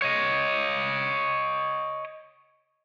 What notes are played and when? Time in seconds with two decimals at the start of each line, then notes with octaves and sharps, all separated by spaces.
0.02 C#5 D#5